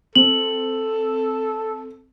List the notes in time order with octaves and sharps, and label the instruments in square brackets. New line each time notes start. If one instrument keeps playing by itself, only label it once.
[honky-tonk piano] C4 [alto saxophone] A4 [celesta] F#7